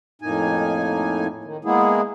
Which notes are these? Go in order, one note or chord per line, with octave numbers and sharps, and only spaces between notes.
F2 A2 A#3 D#4 G#5
D#3
G#3 A#3 B3 E4 G#4